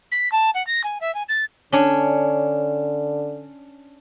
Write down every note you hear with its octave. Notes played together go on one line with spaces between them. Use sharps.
B6
A5
F#5
A#6
G#5
E5
G#5
A6
D3 C#4 D4 C#5